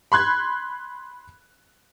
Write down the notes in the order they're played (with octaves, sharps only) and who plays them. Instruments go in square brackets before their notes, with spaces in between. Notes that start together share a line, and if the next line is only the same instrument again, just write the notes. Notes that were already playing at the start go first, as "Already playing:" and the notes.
[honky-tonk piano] B5 C6 F#6 G#6